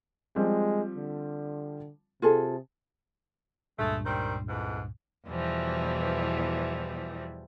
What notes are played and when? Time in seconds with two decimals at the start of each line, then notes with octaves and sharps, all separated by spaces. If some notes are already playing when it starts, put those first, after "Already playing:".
0.36 F3 G3 G#3 C4
0.95 D3
2.22 C3 F4 G#4 A4
3.79 C#2 G2 A#2 G#3 A3
4.05 D#3 G3 C4
4.48 F2 G#2 E3
5.28 E2 B2 E3 F3 G3